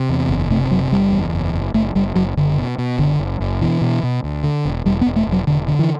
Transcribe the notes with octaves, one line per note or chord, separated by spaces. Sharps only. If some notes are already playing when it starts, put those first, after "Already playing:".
Already playing: C3
E2
F#1
C3 A3
F#1 F#3
F#1 G3
E2
F#1
F#1
F#1 A3
F#1 G3
F#1 F#3
F#1 D3
B2
B2
F#1 D3
F#1
F#1
B2 E3
B2
B2
D2
D3
E1
E1 G3
B3
E1
A3
E1
F#3
E1 D3
D3
E3